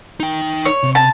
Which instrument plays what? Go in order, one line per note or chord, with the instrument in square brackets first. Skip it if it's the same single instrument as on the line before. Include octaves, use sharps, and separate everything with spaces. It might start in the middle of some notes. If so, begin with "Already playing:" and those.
[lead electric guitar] D#4 G5
[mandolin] C#5
[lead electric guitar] C3
[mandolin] A5